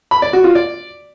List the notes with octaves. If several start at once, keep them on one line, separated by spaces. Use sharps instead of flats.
B5
D5
F#4
F4
D5